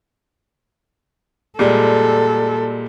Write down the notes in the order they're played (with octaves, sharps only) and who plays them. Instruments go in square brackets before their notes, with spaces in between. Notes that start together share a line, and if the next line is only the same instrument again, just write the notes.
[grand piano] A#2 G3 G#3 [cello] A4